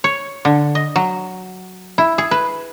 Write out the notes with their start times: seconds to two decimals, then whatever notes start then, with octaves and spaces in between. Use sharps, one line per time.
0.04 C#5
0.45 D3
0.75 D#5
0.96 F#3
1.98 E4
2.18 G#4
2.31 B4